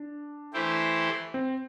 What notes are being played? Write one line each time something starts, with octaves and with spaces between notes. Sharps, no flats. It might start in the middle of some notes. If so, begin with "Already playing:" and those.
Already playing: D4
E3 A3 E4 G4 C5
C4